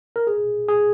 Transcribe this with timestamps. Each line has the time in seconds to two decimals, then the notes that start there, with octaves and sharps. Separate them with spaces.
0.16 A#4
0.27 G#4
0.69 G#4